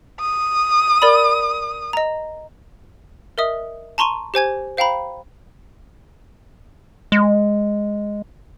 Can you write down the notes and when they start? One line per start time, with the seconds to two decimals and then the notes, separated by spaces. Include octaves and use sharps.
0.21 D#6
1.02 A#4 D5 B5
1.93 D#5 A#5
3.38 A#4 D#5 E5 D#6
3.98 A5 A#5 C6 C#6 D#7
4.34 G4 C5 G#5 G#6
4.77 C5 F5 G5 A#5 B5
7.12 G#3